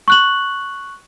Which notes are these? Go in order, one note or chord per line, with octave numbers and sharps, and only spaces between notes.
C#6 F#6 F#7